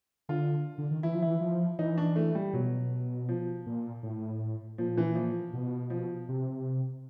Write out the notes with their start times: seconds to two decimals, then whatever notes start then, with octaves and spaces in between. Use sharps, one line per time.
0.29 D3 F4
0.78 D3
0.91 D#3
1.03 E3 E4
1.14 F3
1.22 E3 E4
1.41 F3
1.79 E3 D#4
1.98 D4
2.16 A3
2.35 G3
2.53 B2 F#3
3.29 F3
3.66 A#2
4.03 A2
4.78 A#2 F3
4.97 E3
5.15 F3
5.53 B2
5.90 F3
6.29 C3